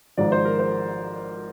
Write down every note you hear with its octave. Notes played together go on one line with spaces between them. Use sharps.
G#1 G#2 F3 D5
C5
A#4
C5